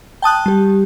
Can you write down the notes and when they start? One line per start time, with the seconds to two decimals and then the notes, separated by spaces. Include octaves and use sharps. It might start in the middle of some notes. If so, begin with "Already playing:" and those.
0.22 G5 A5 D#6 F#6
0.46 G3 G4